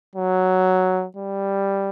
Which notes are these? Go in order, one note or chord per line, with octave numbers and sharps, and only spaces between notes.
F#3
G3